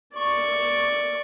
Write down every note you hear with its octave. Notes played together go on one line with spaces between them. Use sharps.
D5 C#6